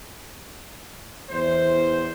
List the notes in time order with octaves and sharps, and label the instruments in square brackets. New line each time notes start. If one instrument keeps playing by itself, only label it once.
[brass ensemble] E2 C5